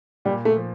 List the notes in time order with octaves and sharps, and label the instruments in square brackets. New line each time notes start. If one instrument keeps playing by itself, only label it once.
[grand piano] A#2 [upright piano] G3
[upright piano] A3
[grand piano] F3